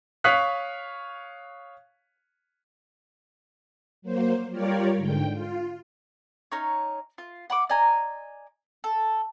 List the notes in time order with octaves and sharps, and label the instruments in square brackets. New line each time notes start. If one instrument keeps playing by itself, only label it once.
[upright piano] C#5 F5 C#6 D#6 F#6 B6
[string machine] F#3 A#3 C5
G3 F4 G4 A#4 C#5 D5
G#2 D3 G5
F4
[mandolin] C#4 D#4 C#5
F4
F#5 B5 D6
D5 D#5 G#5 A#5
A4